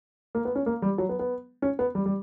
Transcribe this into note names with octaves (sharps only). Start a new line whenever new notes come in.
A#3
B3
C#4
A#3
G3
F#3
B3
B3
C#4
B3
G3
G3